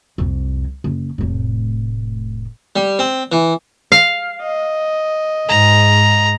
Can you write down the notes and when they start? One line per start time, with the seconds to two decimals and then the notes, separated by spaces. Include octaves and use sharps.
0.18 C2 F2
0.84 F#1
1.18 F1 A2
2.76 G3
2.99 C4
3.32 E3
3.92 F5
4.42 D#5
5.49 G#2 A#5